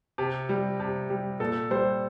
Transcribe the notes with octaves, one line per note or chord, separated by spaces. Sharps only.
C3
G3
C3
G3
A#2 A4
G3 C5